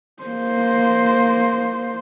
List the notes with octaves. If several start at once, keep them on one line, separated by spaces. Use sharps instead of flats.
A#3 C5